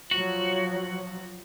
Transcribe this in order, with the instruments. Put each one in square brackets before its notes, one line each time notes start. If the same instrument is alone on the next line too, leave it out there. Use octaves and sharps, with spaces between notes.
[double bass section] F3 F#3 [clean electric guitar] F#4